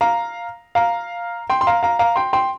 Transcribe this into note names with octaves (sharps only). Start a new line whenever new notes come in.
F5 A#5
F5 A#5
G5 C6
C6
F5 A#5
F5 A#5
F5 A#5
G5 C6
G5 C6